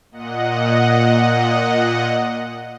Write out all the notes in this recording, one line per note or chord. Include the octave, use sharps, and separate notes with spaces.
A#2 D#5 F#5